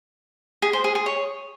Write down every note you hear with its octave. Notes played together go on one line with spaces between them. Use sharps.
G#4
C5
G#4
G#4
C#5